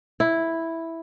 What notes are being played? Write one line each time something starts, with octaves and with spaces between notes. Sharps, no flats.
E4